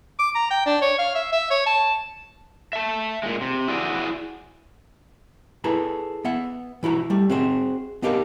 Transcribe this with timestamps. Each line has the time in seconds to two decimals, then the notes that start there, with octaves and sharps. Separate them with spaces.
0.19 D6
0.35 A#5
0.51 G5
0.66 D4
0.82 C#5
0.99 F5
1.15 E5
1.32 E5
1.51 C#5
1.66 A5
2.73 E5 A5
3.23 A#2 G#3
3.41 C3
3.68 E4 F#4 G#4 D5
5.64 E4 G#4 A4 B4 A#5
6.25 B3 E5 F#5
6.83 E3 E4 F#4 A#5
7.10 G3 A3
7.30 C4 F#4 G#4 C5
8.02 B3 D4 D#4 G4 A#4 F5